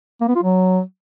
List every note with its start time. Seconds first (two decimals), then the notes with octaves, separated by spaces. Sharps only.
0.21 A#3
0.28 B3
0.35 F4
0.43 F#3